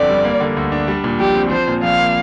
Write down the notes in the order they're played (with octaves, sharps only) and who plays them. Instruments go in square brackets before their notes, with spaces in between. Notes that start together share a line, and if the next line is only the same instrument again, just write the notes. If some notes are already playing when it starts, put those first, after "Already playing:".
Already playing: [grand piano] G1 F2 D3 [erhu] D5
[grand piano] G3
A#3
D3
D2
D4
G3
A#2
[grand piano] A#1 [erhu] G4
[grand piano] C4
[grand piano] F3 [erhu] C5
[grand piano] A#2
[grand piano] A#1 [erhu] F5
[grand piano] A#3